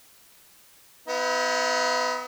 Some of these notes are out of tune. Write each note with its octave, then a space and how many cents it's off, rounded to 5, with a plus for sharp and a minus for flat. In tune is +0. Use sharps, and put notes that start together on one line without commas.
B3 +30 E4 -45 F5 +0